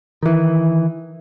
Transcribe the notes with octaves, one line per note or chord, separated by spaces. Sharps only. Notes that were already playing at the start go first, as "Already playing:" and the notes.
D#3 E3